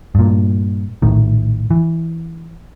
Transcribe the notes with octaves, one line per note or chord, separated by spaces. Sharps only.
G2 A#2
A#1 A2 D#3
E3